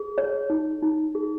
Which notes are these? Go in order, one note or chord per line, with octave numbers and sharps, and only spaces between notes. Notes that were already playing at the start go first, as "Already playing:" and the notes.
Already playing: G#4
C#5
D#4
D#4
G#4